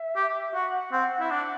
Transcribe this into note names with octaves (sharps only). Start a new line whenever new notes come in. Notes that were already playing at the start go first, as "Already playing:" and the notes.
Already playing: E5
G4
F#4 F#5
C4
E4
D4 F#5